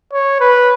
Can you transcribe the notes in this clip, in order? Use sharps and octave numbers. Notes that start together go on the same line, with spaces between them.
C#5
B4